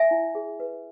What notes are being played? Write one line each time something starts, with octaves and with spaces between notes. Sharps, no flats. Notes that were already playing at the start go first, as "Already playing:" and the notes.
Already playing: E5 G#5
E4
G#4
B4